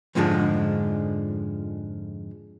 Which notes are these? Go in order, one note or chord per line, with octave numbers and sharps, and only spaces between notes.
F2 G#2 D3 F3 G#3 D4